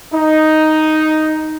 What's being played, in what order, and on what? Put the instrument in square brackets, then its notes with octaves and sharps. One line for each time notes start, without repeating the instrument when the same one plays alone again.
[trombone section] D#4